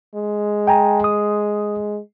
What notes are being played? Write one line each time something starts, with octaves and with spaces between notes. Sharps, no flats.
G#3
G5 G#5 A#5
D#6